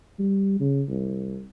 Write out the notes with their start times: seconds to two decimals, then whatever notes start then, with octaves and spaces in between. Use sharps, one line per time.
0.19 G3
0.60 C#3
0.89 C2